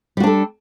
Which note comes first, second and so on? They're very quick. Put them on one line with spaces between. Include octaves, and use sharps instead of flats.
G3 F#4 D4 A4